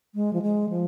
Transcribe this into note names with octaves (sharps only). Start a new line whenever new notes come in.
G#3
F3
G#3
F3